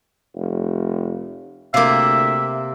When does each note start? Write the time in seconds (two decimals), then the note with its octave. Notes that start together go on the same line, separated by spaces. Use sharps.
0.36 F1
1.74 D2 C3 A#3 E5 F5 D6